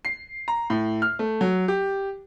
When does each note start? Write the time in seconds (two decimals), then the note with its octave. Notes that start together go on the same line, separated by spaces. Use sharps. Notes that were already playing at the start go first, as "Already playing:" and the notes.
0.05 C7
0.48 A#5
0.70 A2
1.02 F6
1.19 A3
1.41 F#3
1.68 G4